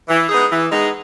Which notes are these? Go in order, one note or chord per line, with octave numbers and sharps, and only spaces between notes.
E3
G#3 B3 D#4 G#4
E3
G#3 B3 D#4 G#4